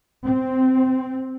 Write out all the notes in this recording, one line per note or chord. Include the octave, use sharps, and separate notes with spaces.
C4